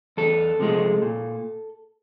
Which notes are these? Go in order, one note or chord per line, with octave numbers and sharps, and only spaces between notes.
E2 A4
C3 F3 G#3
A#2